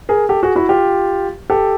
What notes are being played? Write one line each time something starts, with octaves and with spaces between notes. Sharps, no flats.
G#4 A#4
G4 A4
F#4 G#4
E4 F#4
F4 G4
G4 A4